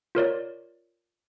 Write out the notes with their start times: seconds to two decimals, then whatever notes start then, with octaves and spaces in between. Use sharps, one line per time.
0.15 F4 A#4 C#5 D5